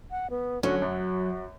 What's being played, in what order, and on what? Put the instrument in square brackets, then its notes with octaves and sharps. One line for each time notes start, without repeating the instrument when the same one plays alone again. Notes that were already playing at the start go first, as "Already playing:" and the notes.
[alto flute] F#5
B3
[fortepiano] D3 C#4 [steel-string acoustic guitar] F#3 [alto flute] F#4
[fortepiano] F#2 [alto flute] F#4